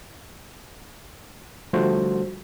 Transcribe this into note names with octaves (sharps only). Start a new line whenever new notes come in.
D3 F3 G3 A3 F#4 C5